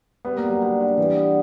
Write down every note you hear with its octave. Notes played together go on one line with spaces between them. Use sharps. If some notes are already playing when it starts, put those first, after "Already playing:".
G3 B3
A#3
B3
F#3
D3
D3
E3 G3
B3